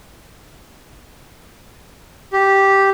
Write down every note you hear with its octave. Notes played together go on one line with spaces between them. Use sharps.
G4